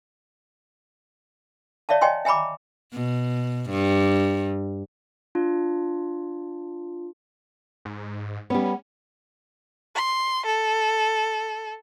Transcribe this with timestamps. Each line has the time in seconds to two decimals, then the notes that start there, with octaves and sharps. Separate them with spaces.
1.89 C#5 D5 E5 F5 A5
2.01 C#5 D#5 G5 G#5 C6
2.25 E5 G#5 A#5 B5 D6
2.93 B2
3.70 G2
5.35 D4 F4
7.85 G#2
8.50 G3 B3 C#4
9.95 C6
10.46 A4